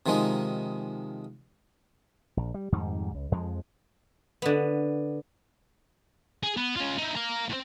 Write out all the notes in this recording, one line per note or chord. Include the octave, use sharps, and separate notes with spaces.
C3 D#3 F3 G#3 D#4
A#1
G3
F2 G#2 D#3 G3
C#2
F2 F3 G#3
D3 B3
G#4
B3
C#4 F4
D#4 E4
F5 A#5
A2 C4